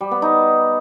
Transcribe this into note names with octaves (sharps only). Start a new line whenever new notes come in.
G3
B3
D#4